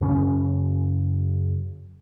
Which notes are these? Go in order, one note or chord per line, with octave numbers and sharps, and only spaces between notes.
F#2 C#3 C#4